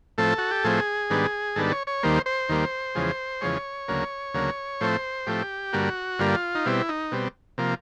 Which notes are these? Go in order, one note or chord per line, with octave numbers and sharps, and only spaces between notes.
A2 F3 A3 C4 A4
F#4
G4
A2 F3 A3 C4 G#4
G#2 D#3 G3 B3 D4
G#2 D#3 G3 B3 D4 A4
C#5
C#5
D#2 D#3 G3 A#3 C5
C5
D#2 D#3 G3 A#3
E2 C#3 F3 G#3
E2 C#3 F3 G#3 C#5
D2 C#3 F#3 A#3
D2 C#3 F#3 A#3
A2 F3 A3 C4 C5
A2 F3 A3 C4 G4
G2 D3 G3 A#3 F#4
G2 D3 G3 A#3 F4
D#4
B2 G3 C4 E4
D#4
B2 G3 C4
C3 F3 A#3